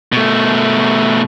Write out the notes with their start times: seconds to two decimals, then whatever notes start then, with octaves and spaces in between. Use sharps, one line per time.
0.12 B2 A3